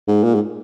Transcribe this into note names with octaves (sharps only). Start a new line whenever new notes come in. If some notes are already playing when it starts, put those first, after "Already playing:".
G#2
A#2
G#2